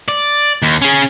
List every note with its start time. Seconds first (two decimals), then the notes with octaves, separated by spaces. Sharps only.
0.08 D5
0.62 D#2
0.82 C#4 G#4